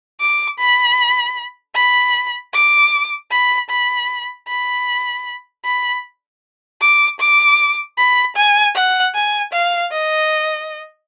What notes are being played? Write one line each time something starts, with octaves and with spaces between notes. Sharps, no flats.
D6
B5
B5
D6
B5
B5
B5
B5
D6
D6
B5
G#5
F#5
G#5
F5
D#5